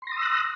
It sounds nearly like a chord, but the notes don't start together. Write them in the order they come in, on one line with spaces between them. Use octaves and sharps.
C6 A#6 D#6 E6 F#6